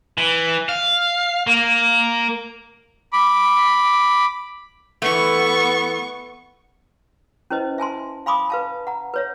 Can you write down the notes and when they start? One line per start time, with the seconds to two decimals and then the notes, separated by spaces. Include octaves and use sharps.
0.18 E3
0.69 F5
1.47 A#3
3.13 B5 D6
5.02 E3 A3 B3 C#6
7.50 C#4 E4 B4 C5 D#5
7.78 E5 G#5 A5 C6
8.26 F5 G#5 B5 C6 D6 D#6
8.50 B4 F5 A5
8.87 F#5 A#5
9.14 B4 C#5 E5